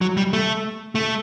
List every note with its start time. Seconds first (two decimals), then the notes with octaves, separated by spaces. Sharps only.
0.01 F#3
0.17 G3
0.33 A3
0.95 A3